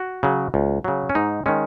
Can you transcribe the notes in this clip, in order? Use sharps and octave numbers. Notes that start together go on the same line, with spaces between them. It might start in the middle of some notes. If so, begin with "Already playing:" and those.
Already playing: F#4
C#3 F#3
C#2
C#3 F#3
C#4
G#2 D#4
D#3 G#3 C#4